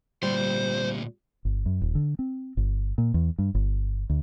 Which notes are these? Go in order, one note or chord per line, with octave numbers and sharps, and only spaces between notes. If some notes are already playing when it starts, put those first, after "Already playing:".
D2 A#2 G3 C5
G1
F#2
D#1
D3
C4
G1
A#2
E2
G2
G1
D2